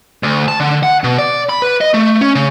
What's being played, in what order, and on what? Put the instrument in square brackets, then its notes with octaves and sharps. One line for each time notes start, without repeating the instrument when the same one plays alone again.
[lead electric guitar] D2
A5
D3
F#5
B2
D5
B5
B4
D#5
A3
C#4
C#3